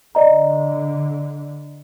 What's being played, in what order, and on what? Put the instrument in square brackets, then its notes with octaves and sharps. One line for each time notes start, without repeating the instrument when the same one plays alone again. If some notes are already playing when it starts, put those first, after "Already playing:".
[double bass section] D3 [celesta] D5 D#5 A#5